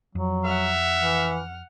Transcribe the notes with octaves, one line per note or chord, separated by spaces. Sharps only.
F2 F#3
E5 F#5 F6
E3